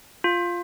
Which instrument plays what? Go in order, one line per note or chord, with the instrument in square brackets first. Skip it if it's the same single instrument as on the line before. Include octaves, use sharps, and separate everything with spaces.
[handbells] F4